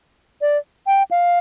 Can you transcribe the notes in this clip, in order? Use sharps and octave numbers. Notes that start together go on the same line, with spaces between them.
D5
G5
F5